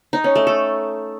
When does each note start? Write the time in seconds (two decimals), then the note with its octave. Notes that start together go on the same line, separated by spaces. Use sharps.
0.13 D#4
0.24 C#4
0.35 A3
0.47 A4